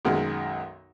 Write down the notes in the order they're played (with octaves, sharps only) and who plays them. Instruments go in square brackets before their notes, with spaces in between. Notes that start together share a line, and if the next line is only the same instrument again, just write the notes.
[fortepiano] B1 F#2 D#3 G#3